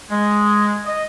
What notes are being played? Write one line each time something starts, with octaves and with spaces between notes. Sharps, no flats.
G#3
D#5